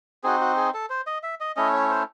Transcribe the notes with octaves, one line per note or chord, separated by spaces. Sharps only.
C4 D#4 F#4 G#4
F#4
G#4
A4
C5
D#5
E5
D#5
A3 C#4 E4 D#5
C#5
C5